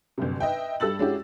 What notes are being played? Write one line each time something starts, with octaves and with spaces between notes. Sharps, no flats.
G1 F#2 C3
B4 D#5 E5 G5
G2 G3 A4 E6 A6 F#7
G#3 C#4 D4 E4 F#4 G4